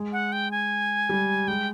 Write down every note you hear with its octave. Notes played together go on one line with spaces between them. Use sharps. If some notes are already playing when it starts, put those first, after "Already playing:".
Already playing: G#3
F#5
G5
G#5
G3
G#3 G5